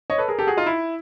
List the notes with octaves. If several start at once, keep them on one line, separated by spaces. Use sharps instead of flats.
C#5 D#5
A4 B4
G#4 A#4
G4 A4
F#4 G#4
D#4 F4
E4